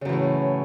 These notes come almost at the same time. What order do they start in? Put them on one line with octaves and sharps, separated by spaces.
C#3 F#2 E3 A2